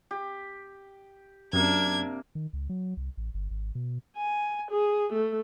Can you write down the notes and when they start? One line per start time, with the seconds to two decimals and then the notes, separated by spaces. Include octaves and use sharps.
0.11 G4
1.53 F#2 C3 A#3 D4 G#6
2.35 D#3
2.53 C#2
2.69 F#3
2.97 C2
3.17 A1
3.34 G1
3.50 G#1
3.75 B2
4.17 G#5
4.71 G#4
5.13 A3